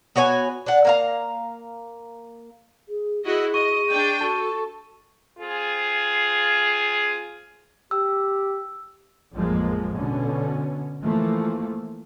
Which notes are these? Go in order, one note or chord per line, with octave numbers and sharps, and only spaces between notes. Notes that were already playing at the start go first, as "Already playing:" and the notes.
B3 F#4 C#5 G#5
D4 F#5
A#3 F5 A#5
G#4
E4 F#4 G#4 D#5
D#5 C#6 D#7
D4 D5 G5
F#4 A4 A5 C#6
C4 F4 G#4
G4 E6
A1 F2 F3 G#3 A#3
B2 D3 C#4
E3 F3 A3 A#3